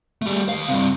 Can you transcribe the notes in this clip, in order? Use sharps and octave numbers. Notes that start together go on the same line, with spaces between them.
G3 A3
D#2 F5
G2 C3